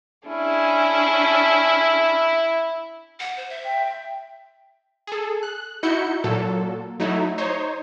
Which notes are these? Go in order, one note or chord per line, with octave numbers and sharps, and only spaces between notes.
C#4 D4 E4 G#4
F#5
C5
E5
G5
G#4 A4
F#6
D#4 E4 F#4 G6 C#7
A#2 F#3 A4
F#3 A3 D#4 E4
D#4 C5 C#5